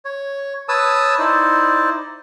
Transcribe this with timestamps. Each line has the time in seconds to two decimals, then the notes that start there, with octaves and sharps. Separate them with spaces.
0.05 C#5
0.69 B4 C#5 A5 D#6 E6
1.19 D#4 E4 C5 D5